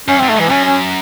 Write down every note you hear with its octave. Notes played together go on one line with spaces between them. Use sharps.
F#2 C#4
G#2 C4
A3
G#2 E3
F#2 C#4
C#4